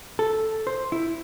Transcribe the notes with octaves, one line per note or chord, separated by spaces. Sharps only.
A4
C5
E4